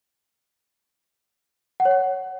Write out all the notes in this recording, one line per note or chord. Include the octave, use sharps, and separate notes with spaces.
F#5
C#5
F#5